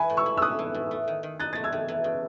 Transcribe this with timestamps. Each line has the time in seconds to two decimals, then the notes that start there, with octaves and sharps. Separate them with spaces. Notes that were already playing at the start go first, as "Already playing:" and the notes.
Already playing: E3 G#5 B5
0.10 A2
0.17 C#6 E6
0.26 E4
0.37 E6
0.42 A3 D#6 F#6
0.59 E3
0.74 A2
0.91 A3
1.08 D#3
1.23 D#3
1.40 D#4 F#6 A6
1.53 A3 A6
1.64 E6 G#6
1.72 D#3
1.88 E3
2.04 C#3